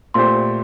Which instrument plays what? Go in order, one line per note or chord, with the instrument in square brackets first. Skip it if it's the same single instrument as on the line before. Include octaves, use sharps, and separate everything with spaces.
[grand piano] A#2 A3 C4 G4 C5 [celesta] C6